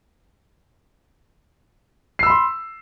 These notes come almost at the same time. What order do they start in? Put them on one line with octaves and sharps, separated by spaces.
C7 E6 B5 C6